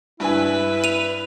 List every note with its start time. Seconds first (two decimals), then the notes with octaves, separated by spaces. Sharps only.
0.20 G2 E4 B4 G#5
0.84 D#7 F7